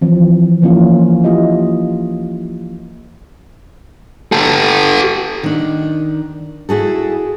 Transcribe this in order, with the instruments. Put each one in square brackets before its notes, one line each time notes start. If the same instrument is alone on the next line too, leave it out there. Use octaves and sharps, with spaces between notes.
[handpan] E3 F3 C4
E3 F3 A#3 C#4 E4 F4
A#3 E4 F4 G4 D#5
[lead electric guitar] G4 A4
[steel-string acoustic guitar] D#3 D4
E4 F#4 G#4 A4